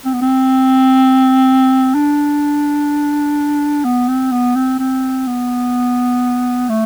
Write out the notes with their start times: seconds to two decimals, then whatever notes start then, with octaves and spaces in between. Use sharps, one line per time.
0.05 C4
0.14 B3
0.22 C4
1.95 D4
3.85 B3
4.08 C4
4.32 B3
4.56 C4
4.79 C4
5.27 B3
6.69 A3